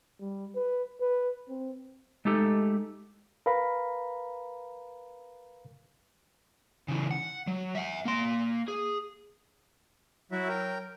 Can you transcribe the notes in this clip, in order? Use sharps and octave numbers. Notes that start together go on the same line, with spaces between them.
G3
B4
B4
C4
G#3 A3 D#4 G4 A4
A#4 B4 F5 A#5 B5
C#3 E3
F#5
F#3
E5 F#5
A#3 C6
G#4
F#3 E4 F#4 E5
A#4 G5